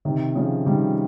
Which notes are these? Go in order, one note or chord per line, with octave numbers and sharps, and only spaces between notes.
C3 D#3
C#3 F3
D#3 G3